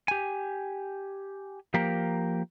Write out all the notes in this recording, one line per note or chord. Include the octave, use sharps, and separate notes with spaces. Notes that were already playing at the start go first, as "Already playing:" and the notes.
G4 G#5
F3 A#3 G4 A#4